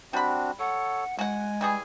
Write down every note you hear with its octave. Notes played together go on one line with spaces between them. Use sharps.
G3 C4 D4 F#4 B5
A4 C#5 F#5
G#3 F#4 F#5 G#5
E3 G3 G#4